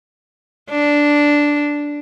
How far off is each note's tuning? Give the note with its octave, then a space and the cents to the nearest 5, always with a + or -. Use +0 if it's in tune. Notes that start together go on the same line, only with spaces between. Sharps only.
D4 -5